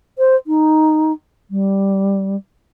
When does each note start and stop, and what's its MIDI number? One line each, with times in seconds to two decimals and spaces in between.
0.18 0.36 72
0.47 1.12 63
1.50 2.36 55